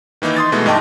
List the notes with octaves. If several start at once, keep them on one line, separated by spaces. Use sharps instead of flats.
D#3 E3 A#3 D#4
C6 D#6 A6
B2 E3 G#3 A3
G2 D#4 D#5 G5 A5 D6